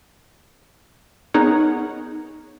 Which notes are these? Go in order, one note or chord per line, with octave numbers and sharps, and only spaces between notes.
B3 D#4 G#4 A#4 C#5 F#5